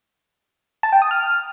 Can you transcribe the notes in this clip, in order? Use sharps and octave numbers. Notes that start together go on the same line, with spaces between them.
A5
G5
D#6
F6